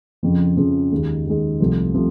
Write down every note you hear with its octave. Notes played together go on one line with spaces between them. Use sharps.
F2 C#3 F3
F2 C#3 F3
D#2 D#3 G#3
D#2 D#3 G#3
C2 C3 F3 A3
C3 F3 A3